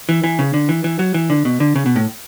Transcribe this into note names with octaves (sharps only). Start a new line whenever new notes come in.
E3
E3
C#3
D3
E3
E3
F#3
E3
D3
B2
D3
C#3
B2
A2